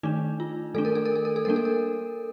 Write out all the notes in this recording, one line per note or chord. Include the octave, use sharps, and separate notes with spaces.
D#3 A3 D4 D#4
F4
D#3 A3 D4 A4
A#4
A4
A#4
A4
A#4
A4
G3 A#3 D4 A#4
A4
A#4